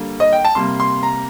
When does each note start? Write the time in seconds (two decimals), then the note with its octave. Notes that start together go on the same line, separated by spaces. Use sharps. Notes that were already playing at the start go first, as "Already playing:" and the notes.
Already playing: D3 G3 A#3
0.20 D#5
0.33 G5
0.45 A5
0.55 C3 G3 A#3 C6
0.80 C6
1.03 A#5